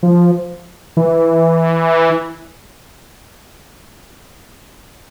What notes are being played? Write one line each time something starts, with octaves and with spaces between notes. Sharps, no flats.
F3
E3